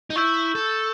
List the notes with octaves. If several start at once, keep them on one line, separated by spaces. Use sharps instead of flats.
D#4
E4 C#6 E6 G6
A4